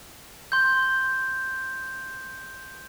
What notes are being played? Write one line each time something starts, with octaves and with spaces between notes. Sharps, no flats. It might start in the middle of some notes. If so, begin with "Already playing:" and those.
C6 G6